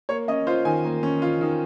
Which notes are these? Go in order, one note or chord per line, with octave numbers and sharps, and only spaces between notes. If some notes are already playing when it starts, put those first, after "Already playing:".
A#3 C#5
C#4 D#5
F4 C5
D#3 G#5
A#3
C#4
F4
D#3